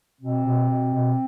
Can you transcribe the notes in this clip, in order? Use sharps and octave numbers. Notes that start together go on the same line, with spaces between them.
B2 C4
B2
B2
B2